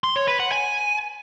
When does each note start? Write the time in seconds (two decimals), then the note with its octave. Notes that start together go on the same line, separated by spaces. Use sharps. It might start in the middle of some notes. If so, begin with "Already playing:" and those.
0.04 C6
0.16 C#5
0.28 B4
0.40 F#5
0.52 G#5